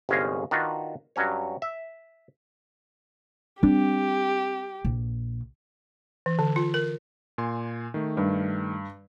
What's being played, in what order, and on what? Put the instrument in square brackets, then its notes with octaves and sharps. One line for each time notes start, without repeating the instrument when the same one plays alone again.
[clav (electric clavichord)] G1 C2 G#3 C#4 G#4 F5
D#3 D4 F4 F#4 B4 F#5
G2 F#3 C#4 C#5
E5
[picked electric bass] G3 D4 [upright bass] C4 [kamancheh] G4
[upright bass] A#1
[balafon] E3
D3
F4
A#4
[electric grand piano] A#2 G#5 C6
D#3 A3
[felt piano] G2